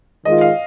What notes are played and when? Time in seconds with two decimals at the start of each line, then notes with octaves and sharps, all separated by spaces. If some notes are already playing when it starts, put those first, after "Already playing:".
0.25 D#3 G#3 F4 D#5
0.41 F5